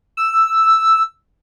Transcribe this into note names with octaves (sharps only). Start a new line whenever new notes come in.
E6